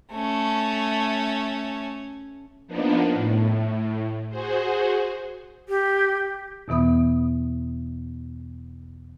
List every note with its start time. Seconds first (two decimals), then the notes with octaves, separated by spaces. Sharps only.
0.13 A3 C#4
2.67 F3 A#3 B3 D4 D#4
3.13 A2
4.29 F#4 G#4 C5
5.69 G4
6.68 E2 B2 E3 B3 D#6